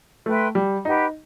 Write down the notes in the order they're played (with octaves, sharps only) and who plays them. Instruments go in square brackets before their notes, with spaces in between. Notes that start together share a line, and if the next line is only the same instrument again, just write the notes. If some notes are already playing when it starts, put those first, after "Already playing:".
[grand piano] A3 [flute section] B4 E5 G5 C6
[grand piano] G3
[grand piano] D#4 [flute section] G4 B4 F#5